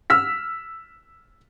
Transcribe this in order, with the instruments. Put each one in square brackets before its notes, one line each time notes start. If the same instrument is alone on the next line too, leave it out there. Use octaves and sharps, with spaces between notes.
[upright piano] E6 F6 B6